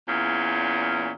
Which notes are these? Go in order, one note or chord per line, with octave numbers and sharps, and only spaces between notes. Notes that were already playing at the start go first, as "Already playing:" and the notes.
E2 A#2 C#4